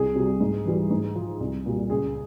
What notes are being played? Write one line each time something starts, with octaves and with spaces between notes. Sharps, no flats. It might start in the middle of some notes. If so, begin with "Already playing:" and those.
Already playing: C2 G#4
C3 G3
G#2
E3 G3
G#2
F3
C2
A#2 G3
C#2 G#4